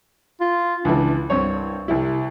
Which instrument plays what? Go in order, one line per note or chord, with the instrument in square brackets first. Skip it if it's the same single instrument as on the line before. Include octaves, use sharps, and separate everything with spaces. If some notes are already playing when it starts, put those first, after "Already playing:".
[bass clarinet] F4
[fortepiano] C#2 E3 [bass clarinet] D4
[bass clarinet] C2 [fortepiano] G2 C4 C#5
[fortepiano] C2 E4 [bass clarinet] C3